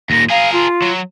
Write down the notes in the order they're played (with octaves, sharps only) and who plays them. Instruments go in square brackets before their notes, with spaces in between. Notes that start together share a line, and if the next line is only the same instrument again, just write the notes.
[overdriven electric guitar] D#2 A#2 [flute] A#6
[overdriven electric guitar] G#4 A#4 [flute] F5
[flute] F4
[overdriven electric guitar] F#3